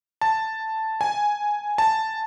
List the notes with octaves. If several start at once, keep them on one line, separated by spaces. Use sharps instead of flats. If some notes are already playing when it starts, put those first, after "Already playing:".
A5
G#5
A5